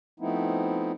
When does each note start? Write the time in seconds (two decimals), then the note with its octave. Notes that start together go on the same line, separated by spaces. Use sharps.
0.20 F3 A3 B3 C4 D#4 E4